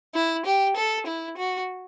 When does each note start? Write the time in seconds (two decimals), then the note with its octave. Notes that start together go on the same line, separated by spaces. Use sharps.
0.14 E4
0.46 G4
0.76 A4
1.07 E4
1.37 F#4